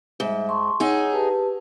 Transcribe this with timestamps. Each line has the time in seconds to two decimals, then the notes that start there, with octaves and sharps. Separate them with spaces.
0.20 G#2 G3 E5
0.49 A5 C6 C#6
0.80 D#4 G#4 C#5 F#5 E6
1.12 G4 B4 A5